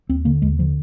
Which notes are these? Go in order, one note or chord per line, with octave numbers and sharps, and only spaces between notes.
D#2 C4
D3 A#3
D#2 G#3
D3 F3